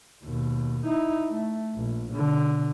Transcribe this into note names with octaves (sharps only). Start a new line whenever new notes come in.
D#2 B2
D#4 E4
A3
A#1
B2 D3